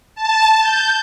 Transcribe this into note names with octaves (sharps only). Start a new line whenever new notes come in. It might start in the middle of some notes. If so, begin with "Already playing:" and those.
A5
G6